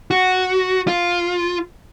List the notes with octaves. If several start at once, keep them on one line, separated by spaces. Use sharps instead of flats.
F#4
F4